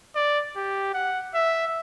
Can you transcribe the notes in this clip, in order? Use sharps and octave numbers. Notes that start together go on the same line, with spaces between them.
D5
G4
F#5
E5